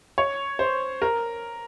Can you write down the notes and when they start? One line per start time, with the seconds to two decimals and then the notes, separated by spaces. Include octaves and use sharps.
0.18 C#5
0.59 C5
1.02 A#4